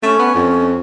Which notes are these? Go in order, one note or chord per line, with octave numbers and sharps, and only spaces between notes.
A3 C#4
B3
F2